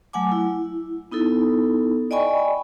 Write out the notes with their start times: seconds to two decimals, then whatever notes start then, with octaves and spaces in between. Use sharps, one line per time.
0.13 F#3 A3 F#5 G#5 D6
0.32 E4
1.11 B3 D#4 E4 A4
2.11 D5 D#5 G5 G#5 B5 C#6